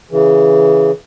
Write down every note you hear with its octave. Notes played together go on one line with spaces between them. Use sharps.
C#3 E3